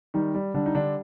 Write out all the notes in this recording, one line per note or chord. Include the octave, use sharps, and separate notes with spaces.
D#3 G3 D#4
G3
D3 G3 D4
D#4
D3 G3 D4